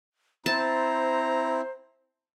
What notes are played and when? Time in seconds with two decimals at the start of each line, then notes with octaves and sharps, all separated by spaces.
0.46 C4 E4 C5 A5 A#5